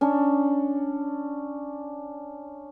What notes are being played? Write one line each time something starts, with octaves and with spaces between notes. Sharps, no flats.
C#4 D4